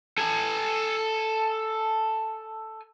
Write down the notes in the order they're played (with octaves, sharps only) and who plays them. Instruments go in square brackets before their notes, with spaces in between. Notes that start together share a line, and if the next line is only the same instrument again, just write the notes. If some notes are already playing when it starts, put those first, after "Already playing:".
[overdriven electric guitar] A4 G#5